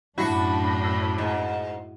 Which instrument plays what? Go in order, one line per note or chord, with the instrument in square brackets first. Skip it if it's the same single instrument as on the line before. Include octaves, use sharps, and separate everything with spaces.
[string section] F#2 D4 B5 [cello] A2 [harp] E4 [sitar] F#4
[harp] E6
[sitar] G#2